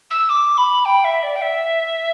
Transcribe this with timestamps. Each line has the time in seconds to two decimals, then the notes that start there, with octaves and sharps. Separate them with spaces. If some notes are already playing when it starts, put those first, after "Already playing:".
0.10 E6
0.29 D6
0.57 B5
0.85 G5
1.04 E5
1.22 D5
1.35 G5
1.41 E5